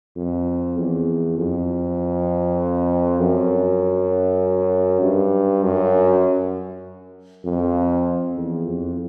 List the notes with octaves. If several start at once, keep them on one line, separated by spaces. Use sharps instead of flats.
F2
E2
F2
F#2
G2
F#2
F2
E2
F2